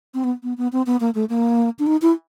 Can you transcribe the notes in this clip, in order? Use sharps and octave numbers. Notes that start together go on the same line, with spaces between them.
C4
B3
B3
B3
C4
B3
A#3
A3
A#3
D4
D#4
E4